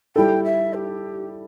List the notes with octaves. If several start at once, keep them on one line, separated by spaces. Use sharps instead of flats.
G3 E4 A4 G5
E5
G4